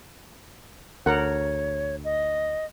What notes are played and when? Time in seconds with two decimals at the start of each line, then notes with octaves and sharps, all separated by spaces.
1.06 D2 A#4 C#5 F#5
2.04 D#5